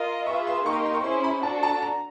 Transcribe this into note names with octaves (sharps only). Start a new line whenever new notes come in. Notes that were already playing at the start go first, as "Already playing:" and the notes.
Already playing: F4 A#4 D#5
F4 G#4 B4 E5 C#6
C6
A#3 D#4 G4 A#4 C#6
C6
C6
C#6
C#4 E4 G#4 C5 C6
B5
D4 F#4 A4 A5
A5
A#5